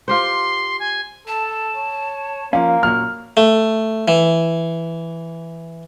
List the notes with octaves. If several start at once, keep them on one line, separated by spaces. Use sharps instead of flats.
F4 G4 C5 C6
G#5
A4 A5
C#5
F3 A#3 C#4 F5
F#2 A#2 F#3 F6
A3
E3